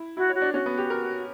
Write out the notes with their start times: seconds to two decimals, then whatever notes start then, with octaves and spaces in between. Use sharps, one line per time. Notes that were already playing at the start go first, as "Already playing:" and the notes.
Already playing: E4
0.17 E4 F#4
0.29 C#5
0.35 F#4
0.42 D4
0.54 C#4 F#4
0.66 B3
0.78 G4
0.90 A#4